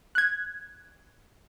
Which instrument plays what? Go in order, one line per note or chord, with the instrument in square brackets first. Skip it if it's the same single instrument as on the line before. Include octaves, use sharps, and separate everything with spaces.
[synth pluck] F#6 G#6